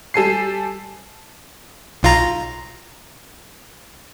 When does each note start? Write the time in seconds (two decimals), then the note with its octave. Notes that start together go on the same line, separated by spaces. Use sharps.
0.14 G3 A4 G#5 C7
2.03 B1 F4 A#5